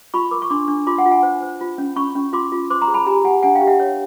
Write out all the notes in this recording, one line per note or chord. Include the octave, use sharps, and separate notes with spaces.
F4 B5 C#6
A#4 D6
C#6
D4 C6 D6
D4
F4 C6 D6
F#5 G#5
F4
F#5 G#5
C5
C5
F4
C#4
C#4 B5 C#6
C#4
F4 C6 D6
F4
C5 C6 D6
A#5 C6
G#4
A5 B5
G4 G#5 A#5
G4 F#5 G#5
D4 F#5 G#5
F5 G5
G4
E5 F#5
C#5